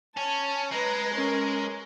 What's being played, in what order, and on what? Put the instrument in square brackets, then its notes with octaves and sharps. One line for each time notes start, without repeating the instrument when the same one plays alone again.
[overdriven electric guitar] C#4 [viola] A5
[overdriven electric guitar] G#3 [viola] B4 A#5
[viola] C#4 A#4